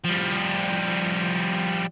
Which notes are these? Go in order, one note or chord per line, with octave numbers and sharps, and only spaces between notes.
F3 G3